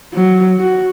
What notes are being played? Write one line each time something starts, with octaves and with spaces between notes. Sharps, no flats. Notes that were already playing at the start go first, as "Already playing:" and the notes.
F#3
F#4